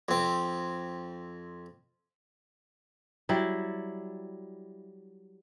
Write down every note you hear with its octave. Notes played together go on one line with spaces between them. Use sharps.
F2 C4
F#3 G3 E4